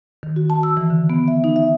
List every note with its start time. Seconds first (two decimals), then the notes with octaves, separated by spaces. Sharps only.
0.23 D#3
0.36 F#4
0.50 A5
0.63 E6
0.77 E3
0.90 D3
1.10 B3
1.28 E5
1.44 D#4
1.56 E5